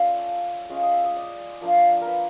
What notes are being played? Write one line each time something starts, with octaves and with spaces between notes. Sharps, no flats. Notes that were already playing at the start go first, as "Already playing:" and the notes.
Already playing: A3 C#4 F4 D5
G#3 C#4 F4 D#5
D#5
E5
D#5
D5
F3 A#3 D4 F4
A#4
B4